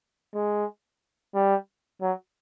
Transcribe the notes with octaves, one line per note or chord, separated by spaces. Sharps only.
G#3
G3
F#3